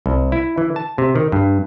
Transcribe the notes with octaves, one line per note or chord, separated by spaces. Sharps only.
C2
E4
E3
A5
C3
D#3
G2